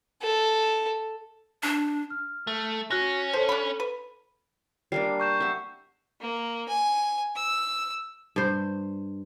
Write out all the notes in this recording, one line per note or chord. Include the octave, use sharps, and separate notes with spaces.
A4
D4
F6
A3
C#4 F#4 F#6 A#6
A4 C5 C#5 A5
D4 A4 B5
B4
G3 A#3 D4 C7
C#6 G6 E7
E5 F#5
A#3
G#5
E6
G2 C5